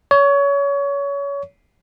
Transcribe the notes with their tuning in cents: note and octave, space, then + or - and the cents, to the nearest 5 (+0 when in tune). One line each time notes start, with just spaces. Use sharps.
C#5 +25